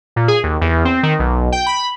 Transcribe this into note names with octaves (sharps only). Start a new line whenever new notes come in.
A#2
G#4
D#2
E2
C4
D#3
B1
G5
B5